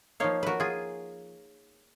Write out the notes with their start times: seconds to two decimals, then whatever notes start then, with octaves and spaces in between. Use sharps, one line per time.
0.20 F3 A#3 D#4 C#5 F5
0.43 F#4 A#4 B4
0.60 F4 G#4